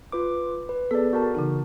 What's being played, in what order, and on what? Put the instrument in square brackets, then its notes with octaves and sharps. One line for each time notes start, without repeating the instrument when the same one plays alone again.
[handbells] F4 B4 D6
B4
[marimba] B3 G#4 [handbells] A4 D5
[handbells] F#4 A#4 A5
[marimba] C#3 E3 D#4